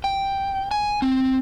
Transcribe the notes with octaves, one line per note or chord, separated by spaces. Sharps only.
G5
G#5
C4